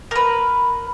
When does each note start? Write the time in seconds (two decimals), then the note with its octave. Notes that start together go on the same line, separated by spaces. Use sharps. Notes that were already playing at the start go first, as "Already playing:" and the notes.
0.11 A#4 B4